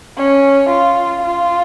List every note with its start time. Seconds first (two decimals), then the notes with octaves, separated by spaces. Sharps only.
0.17 C#4
0.70 F4
1.23 F4